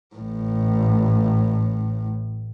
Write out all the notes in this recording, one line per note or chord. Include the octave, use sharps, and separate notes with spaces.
A1 A2